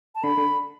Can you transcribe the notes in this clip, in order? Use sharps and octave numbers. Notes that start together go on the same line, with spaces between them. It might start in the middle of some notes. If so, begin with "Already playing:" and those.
A5
D3 B5
D3